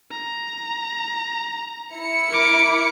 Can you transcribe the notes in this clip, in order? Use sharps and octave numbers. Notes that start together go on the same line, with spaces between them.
A#5
E4 C#7
A#4 D6